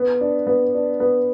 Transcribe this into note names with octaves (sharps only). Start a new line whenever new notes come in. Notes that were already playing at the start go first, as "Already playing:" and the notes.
Already playing: B3
D4
B3
D4
B3